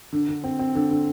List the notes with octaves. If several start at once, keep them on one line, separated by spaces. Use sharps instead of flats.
D3
D3
C4
C4
D3
D3